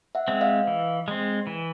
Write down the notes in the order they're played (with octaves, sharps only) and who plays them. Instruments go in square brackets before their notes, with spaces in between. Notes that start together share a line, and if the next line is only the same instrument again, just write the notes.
[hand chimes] E5 F#5
[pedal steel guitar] G#3 C4
[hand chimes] D#5 F5
[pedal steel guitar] E3
G#3 C4
E3